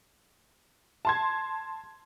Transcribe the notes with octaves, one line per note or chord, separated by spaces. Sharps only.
A5 C6 G#6